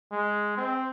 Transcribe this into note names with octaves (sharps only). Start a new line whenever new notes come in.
G#3
C4